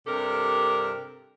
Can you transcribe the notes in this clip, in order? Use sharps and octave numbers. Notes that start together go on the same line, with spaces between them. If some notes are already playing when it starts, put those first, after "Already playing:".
G2 C3 D4 G4 A4 A#4